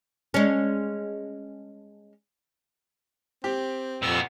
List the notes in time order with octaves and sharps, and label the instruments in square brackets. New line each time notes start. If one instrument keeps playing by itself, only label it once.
[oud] G#3 C#4
[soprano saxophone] C4 [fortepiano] G4
[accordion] F2 E6 [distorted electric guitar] A#2 B3